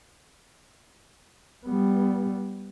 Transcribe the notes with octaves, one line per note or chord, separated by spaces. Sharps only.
G3 B3